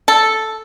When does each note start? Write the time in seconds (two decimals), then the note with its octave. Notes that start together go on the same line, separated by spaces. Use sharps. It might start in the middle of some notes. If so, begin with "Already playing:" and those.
0.08 A4